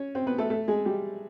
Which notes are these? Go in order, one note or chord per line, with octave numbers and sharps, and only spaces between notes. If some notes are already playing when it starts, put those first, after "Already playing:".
Already playing: C#4 C#5
C4 C5
B3 B4
A3 A4
A3 A4
G#3 G#4
G3 G4